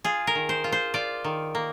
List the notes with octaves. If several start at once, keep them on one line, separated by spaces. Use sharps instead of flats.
F4 G#4
A#4
D#3
C5
F4
C5
F4 D5
D#3
A#3